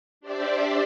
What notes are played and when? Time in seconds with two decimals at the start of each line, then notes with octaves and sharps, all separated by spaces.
0.21 D4 G4 C5 D5 E5